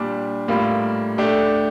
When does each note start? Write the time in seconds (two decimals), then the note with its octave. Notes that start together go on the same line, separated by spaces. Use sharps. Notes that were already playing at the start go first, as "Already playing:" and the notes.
Already playing: A#2 G3 D4 G4
0.48 A2 G3 A#3 F4
1.18 A3 D4 G4